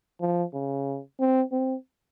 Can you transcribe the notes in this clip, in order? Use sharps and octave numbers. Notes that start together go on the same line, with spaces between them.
F3
C#3
C4
C4